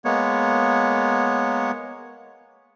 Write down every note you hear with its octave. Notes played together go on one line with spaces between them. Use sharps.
G#3 A#3 B3 C#5